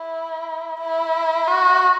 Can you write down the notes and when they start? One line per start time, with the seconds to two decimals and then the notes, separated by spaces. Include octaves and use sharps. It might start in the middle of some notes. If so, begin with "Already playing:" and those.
Already playing: E4
0.80 E4
1.48 F#4